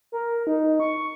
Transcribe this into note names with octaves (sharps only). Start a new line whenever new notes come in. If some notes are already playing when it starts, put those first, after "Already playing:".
A#4
D#4
C#6